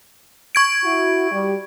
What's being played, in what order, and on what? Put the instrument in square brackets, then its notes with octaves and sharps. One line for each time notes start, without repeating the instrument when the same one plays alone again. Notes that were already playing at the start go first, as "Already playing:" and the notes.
[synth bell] C#6 G#6 D7
[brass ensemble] E4 F#4
G3